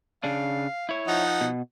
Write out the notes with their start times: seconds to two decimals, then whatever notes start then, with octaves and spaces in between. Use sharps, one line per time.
0.24 C#3 D4 F5
0.89 E4 C#5
1.08 F3 D#4 F#5
1.41 B2